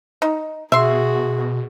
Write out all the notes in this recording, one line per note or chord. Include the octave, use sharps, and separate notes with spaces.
D#4
B2 F#4 G#4 E5 C6